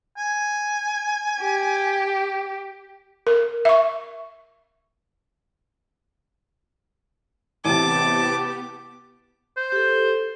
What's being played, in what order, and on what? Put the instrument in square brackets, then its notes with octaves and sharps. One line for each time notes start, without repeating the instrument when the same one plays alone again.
[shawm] G#5
[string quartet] G4
[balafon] A#4
E5 C#6
[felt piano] A1 C3 [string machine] B3 G4 [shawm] A5 [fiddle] D6
[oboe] C5
[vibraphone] G4 A4